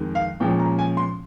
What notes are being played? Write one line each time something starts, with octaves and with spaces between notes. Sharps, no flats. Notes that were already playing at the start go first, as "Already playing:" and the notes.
Already playing: F2 D#3 G#3
F5
A#2 F3 G#3 C#4 G5
A#5
G#5
C6